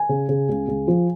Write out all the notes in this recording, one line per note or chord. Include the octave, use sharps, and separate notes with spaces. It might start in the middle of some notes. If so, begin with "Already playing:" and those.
Already playing: G#5
C#3
C#3
C#2
C#2
F3